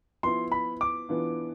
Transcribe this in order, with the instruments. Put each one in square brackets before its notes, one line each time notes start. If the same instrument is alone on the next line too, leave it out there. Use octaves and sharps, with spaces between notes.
[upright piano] F3 B3 E4 [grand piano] C6
[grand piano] B5
D6
[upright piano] E3 B3 D4 F4